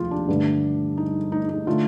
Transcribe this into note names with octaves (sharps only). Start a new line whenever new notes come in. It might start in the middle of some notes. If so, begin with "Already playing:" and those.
Already playing: F1 D#2 F4 G4
D4
G2 D3 A3
D#4
D#4
D#4
D3 A3 F4